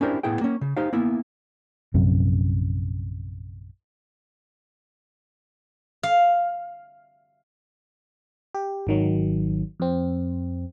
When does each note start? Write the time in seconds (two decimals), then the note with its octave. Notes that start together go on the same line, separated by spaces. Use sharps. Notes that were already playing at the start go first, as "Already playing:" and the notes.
0.01 C#4 D4 E4 G4 A#4 C5
0.23 A2 B3 E4 G#4 G5
0.41 A#3 C#4
0.61 C#3
0.77 D#4 G4 C5 F5
0.93 A#3 B3 E4
1.94 A#1 F#2 C3
6.03 F5
8.55 G4
8.87 G#1 D#3 F#3
9.80 F2 C4